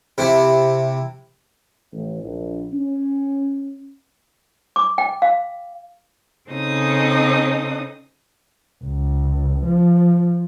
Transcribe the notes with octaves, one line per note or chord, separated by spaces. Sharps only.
C3 E4
A1
A#1
C#4
D6
G5
F5
C#3 C4 C#4 D#4 A4 D#6
C#2
F3